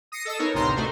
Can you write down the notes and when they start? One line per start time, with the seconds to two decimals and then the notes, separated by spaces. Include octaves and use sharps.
0.12 D#6 A#6 C7 C#7
0.25 A4 D#5 E6
0.39 B3 D#4 A#4 C#5
0.54 A1 D2 C3 C5 A#5 C6
0.76 A3 D#4 F#4 C5